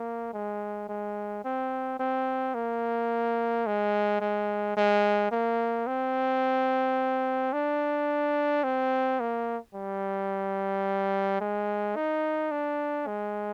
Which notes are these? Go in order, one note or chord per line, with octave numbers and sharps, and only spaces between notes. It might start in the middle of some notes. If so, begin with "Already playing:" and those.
Already playing: A#3
G#3
G#3
C4
C4
A#3
G#3
G#3
G#3
A#3
C4
D4
C4
A#3
G3
G#3
D#4
D4
G#3